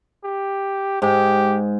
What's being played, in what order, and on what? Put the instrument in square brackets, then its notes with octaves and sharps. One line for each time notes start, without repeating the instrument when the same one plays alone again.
[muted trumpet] G4
[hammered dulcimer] G#2 [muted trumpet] G4